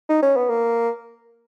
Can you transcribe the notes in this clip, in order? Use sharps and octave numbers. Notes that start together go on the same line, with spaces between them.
D#4
C#4
B3
A#3